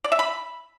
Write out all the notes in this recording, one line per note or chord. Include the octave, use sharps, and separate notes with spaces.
D5
E5
B5